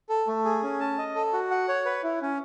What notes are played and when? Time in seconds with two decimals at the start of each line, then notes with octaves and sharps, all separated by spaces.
0.09 A4
0.28 A3
0.45 G#4
0.63 C#4
0.80 A5
0.98 D#5
1.15 A4
1.33 F#4
1.51 F#5
1.68 C#5
1.86 B4
2.03 E4
2.22 C#4